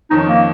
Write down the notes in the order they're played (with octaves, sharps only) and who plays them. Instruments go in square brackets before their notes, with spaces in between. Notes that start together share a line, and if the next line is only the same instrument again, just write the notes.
[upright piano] F2 D#3 C#4 [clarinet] D#4
[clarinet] A#3